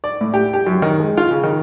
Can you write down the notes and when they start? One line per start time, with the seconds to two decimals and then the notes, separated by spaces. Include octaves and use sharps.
0.04 D5
0.21 A2
0.34 G4
0.53 G4
0.67 F#2
0.82 D#3
1.00 G#3
1.17 F4
1.31 C#3
1.43 D#3